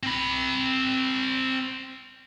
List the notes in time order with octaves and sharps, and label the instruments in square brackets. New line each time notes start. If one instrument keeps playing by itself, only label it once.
[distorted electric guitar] C4 B5